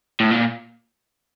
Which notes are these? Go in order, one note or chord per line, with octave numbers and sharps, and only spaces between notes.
A2
A#2